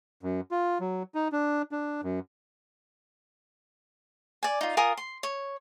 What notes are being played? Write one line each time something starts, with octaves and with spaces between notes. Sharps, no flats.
F#2
F4
F#3
D#4
D4
D4
F#2
D5 G#5
D#4 F4
F4 A#4 G#5 D#6
C6
C#5